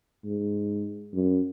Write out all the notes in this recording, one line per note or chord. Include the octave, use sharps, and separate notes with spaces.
G#2
F#2